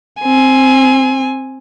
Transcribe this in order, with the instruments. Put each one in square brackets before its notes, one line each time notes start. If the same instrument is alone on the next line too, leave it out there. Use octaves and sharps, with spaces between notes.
[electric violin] C4 G#5